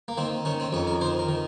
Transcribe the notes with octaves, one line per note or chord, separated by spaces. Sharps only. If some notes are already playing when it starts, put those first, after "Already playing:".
A#3
D#3 C4
D#3 C#4
C4
F2 C#4
A#4
D#3 C5
A#4
D#3